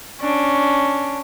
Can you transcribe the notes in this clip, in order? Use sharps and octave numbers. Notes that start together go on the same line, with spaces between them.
C#4 D4